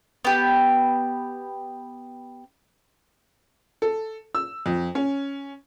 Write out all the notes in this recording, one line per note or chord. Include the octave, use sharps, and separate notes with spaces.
B3 G4
A4
E6
F2
C#4